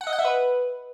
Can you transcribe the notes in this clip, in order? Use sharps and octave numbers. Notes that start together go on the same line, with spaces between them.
F#5
D#5
F#5
E5
B4